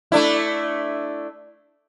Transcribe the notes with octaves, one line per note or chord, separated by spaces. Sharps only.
A3 D4 E4